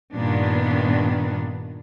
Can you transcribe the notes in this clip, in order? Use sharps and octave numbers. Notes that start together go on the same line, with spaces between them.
G2 A#2 D#3 B3 D4